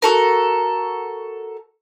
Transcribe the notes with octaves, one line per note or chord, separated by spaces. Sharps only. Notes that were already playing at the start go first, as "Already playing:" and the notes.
F#4 A4 A#4